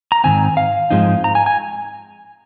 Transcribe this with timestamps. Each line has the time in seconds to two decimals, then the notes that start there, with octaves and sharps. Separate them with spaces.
0.12 A#5
0.24 G#2 D#3 C4 G#5
0.57 F5
0.90 G#2 F3 G#3 C4 D#4
1.24 A#5
1.35 G#5
1.46 G#5